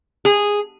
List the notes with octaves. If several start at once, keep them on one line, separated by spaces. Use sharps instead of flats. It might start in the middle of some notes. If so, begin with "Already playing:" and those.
G#4